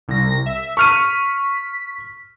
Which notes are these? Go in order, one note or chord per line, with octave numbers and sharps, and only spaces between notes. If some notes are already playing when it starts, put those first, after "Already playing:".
C2 A#6
E5
C#6 F6 B6 D#7